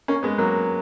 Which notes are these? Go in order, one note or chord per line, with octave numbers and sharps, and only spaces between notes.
A#3 C#4
G#3 B3
F#3 A#3